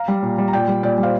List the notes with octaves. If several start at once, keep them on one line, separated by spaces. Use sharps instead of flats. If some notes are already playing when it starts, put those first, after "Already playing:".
Already playing: F5 A#5
G3
A#2
G3
A#5
A#2 D5 G5
G3
A#2 D5 G5
G3
C5 F5